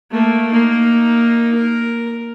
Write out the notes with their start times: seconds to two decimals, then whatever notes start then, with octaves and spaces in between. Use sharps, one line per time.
0.11 A3 A#3
0.51 A#3 D#4
1.55 A#4